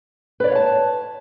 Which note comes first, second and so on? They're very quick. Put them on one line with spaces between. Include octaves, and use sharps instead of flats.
B4 D5 C#5 F5 A5